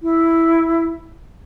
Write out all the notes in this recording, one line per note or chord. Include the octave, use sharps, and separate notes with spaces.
E4